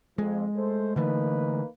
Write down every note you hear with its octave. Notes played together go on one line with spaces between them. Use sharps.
F2 G#3
A3 A4 C5
D3 E3 A3 A#3 D#4 B4